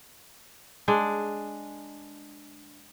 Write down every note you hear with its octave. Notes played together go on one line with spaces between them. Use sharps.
G#3 D4